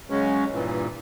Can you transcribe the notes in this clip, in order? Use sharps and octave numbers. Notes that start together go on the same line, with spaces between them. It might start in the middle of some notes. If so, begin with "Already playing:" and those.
C#3 F#3 G#3 C#4
G2 A#2 E3